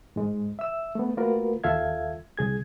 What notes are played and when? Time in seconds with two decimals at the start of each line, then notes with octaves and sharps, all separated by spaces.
0.16 G#2 G#3
0.59 E5 E6
0.95 A3 B3
1.17 A3 A#3 F4 F#4 A#4 B4
1.64 D#2 F4 A4 E5 F5 G#6
2.37 C2 G#4 G#6